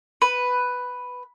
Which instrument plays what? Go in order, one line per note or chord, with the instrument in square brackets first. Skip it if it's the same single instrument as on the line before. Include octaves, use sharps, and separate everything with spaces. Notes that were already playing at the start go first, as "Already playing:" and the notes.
[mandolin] B4